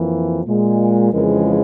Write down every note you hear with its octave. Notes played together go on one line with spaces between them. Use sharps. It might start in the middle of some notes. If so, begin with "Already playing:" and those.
Already playing: F2 E3 A#3
A#2 G#3
F2 C#3 E3 G#3 A#4